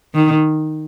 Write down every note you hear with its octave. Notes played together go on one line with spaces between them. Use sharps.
D#3